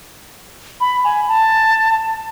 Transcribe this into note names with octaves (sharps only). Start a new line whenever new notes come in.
B5
G#5
A5